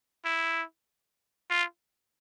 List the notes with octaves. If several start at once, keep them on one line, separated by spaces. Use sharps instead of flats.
E4
F4